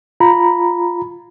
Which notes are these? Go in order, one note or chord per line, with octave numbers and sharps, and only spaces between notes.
F4 A#5 B5